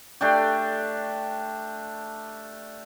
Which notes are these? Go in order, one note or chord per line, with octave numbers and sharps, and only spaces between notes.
A3 D4 G4